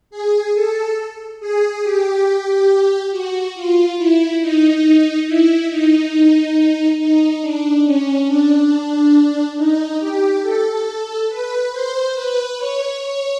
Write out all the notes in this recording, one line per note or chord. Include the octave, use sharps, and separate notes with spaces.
G#4
A4
G#4
G4
F#4
F4
E4
D#4
E4
D#4
D#4
D4
C#4
D4
D#4
G4
A4
B4
C5
B4
C#5
C#5